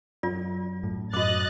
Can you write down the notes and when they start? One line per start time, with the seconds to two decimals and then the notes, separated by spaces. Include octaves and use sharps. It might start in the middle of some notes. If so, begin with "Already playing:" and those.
0.23 F#2 F4 D5
0.84 A2
1.13 F#2 F#4 D#5 D6 F#6 A6